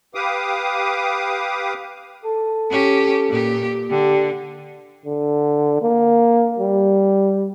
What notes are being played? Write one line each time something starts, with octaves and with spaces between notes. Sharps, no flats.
G4 B4 F5 D6 D#6
A4
C#4 G4
A#2 G4
D3 G4
D3
A#3
G3